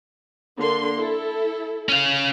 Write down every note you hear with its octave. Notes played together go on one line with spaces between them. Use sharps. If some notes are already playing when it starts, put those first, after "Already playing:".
D3 A#3 C6
E4 A4
C#4 F5